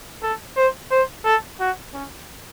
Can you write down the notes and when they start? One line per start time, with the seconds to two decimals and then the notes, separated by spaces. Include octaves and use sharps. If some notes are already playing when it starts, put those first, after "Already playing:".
0.23 A4
0.57 C5
0.91 C5
1.25 A4
1.60 F#4
1.94 C#4